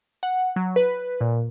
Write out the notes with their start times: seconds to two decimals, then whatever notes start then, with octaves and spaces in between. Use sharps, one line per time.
0.23 F#5
0.56 F#3
0.76 B4
1.21 A#2